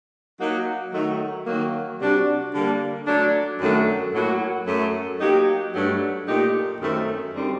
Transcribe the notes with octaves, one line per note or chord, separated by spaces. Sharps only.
F#3 A#3 D#4 F#4
D#3 F#3 A3 D#4 F#4
D#3 F#3 A#3
C3 G3 D4 F#4
D3 G3 A#3
F#3 A3 D4
F#2 D#3 F#3 A3 D4
A2 F#3 A#3 F#4
F#2 F#3 A3
F#3 A#3 D#4 G4
G2 F#3 A3 D4
A#2 A3 D#4 G4
F#2 D#3 A3 C4
F#2 D3 G3 C4 D#4